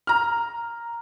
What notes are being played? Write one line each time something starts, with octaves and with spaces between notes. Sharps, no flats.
A#5 F6